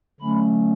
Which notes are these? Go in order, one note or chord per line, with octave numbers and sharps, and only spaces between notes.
D3 F#3 A3 C#4 B5